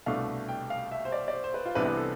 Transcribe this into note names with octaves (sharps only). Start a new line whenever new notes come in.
C2 B2 A3 D4 F5
G5
F5
E5
C5
D5
D5
C5
C5
B4
F4
C2 C3 E3 B3 D4 B4
B4
A4